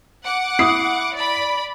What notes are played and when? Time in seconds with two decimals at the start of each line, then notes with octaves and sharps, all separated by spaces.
0.24 F#5 D6
0.59 E4 D#6 C7
1.15 D5 B5